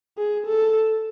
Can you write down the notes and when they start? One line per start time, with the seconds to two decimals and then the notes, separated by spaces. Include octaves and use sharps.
0.18 G#4
0.46 A4